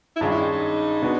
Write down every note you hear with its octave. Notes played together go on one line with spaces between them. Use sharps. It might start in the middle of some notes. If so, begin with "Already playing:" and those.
E4
G2 D#3 G#3 C#4 F4
E4
D#4
D#4
B2 G#3 B3 D4 F#4